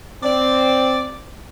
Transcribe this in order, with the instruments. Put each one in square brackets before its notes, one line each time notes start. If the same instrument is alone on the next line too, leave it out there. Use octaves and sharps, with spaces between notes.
[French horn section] C4 [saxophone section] D5